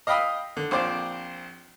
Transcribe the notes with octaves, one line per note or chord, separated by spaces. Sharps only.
D#5 F5 G5 B5 D#6 E6
D3
A#1 C4 C5 D5 D6